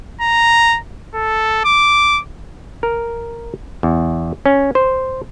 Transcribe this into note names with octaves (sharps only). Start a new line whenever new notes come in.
A#5
A4
D6
A#4
E2
C#4
C5